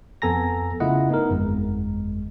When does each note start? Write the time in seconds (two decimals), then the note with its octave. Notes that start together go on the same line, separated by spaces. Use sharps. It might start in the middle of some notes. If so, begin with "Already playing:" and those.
0.22 F2 B3 A4 G#5 A#5 A#6
0.80 C#3 A3 E4 F4 D#5 F#5
1.10 B3 D#4 A#4
1.30 G1 F2 G#3